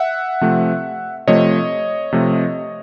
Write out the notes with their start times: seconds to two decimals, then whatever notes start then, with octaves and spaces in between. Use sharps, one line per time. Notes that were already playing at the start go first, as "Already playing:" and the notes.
Already playing: E5 F#5
0.41 C3 F3 A3
1.27 C3 F3 A3 C#5 D#5
2.13 C3 F3 A3